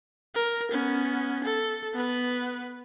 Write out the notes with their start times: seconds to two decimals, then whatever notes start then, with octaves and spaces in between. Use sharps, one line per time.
0.35 A#4
0.71 B3 C#4
1.44 A4
1.94 B3 B4